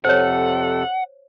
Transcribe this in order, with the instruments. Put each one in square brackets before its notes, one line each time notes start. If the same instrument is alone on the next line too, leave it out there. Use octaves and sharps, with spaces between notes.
[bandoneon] F2 C3 A4 [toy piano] C5 C#5 [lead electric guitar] F#5